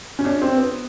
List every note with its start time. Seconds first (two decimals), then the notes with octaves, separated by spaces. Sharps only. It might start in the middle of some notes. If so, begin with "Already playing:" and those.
0.19 C#4
0.25 D4
0.42 C4
0.57 B3